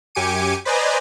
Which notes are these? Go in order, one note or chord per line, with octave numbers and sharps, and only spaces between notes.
F#2 G4 G#5 D6 C#7 D#7
B4 C5 D5 D#5 G#5 A#5